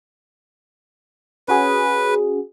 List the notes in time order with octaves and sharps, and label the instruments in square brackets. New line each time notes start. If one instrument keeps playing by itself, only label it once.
[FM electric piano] C#4 F#4 G#4 [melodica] B4